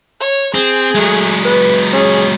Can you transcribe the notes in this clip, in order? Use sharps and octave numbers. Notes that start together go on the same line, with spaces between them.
C#5
C4 G#4
F#3 G#3 A3
B4
C#4 G#4